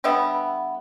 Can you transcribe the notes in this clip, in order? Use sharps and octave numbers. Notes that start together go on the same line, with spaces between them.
D3 G3 B3 E5